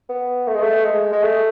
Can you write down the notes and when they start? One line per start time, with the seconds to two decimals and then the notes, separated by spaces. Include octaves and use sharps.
0.09 B3
0.48 A3
0.55 G#3
0.62 A3
0.84 G#3
1.12 G#3
1.23 A3